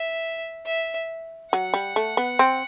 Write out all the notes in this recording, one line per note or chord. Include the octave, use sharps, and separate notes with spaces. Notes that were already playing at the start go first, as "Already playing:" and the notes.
Already playing: E5
E5
F#3 F#5
G3
A3
B3
C4